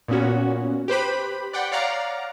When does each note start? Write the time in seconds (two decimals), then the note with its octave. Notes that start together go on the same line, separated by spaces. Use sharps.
0.08 A#2 B3 C#4 F#4
0.88 G4 B4 C5 B5
1.53 D5 F#5 G5 B5 C6
1.71 C#5 D5 F5 F#5 A#5